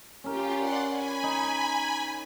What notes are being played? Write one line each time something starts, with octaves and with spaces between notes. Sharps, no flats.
C#4 F4 G4 A#4
D5 F#5 C6
G#5 B5
D#4